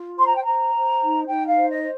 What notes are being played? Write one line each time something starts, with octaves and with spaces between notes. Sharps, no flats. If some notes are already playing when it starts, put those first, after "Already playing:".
Already playing: F4
C5 C6
A#5
G5
C5 A#5
C5
D#4
D#4 G5
F5
C5
D#5
C5